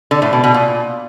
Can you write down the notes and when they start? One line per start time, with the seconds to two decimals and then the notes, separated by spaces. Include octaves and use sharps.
0.11 D3
0.22 A2
0.33 B2
0.44 B2
0.54 A#2